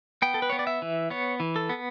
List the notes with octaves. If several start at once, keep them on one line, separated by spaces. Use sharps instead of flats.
B3 G5
A4
B4
B3 C#5
D5
E5
E3
B3 C#5
E3
A4
B3